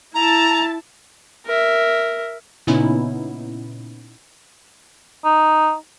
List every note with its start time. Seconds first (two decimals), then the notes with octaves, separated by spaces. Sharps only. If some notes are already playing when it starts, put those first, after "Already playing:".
0.14 E4 A5 A#5
1.46 A#4 E5
2.67 A#2 C#3 B3 C#4 D#4 E4
5.25 D#4